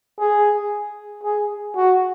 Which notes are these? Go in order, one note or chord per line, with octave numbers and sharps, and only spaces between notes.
G#4
G#4
F#4